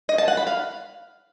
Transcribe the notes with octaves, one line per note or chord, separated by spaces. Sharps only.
D#5
A5
F#5
B5
F5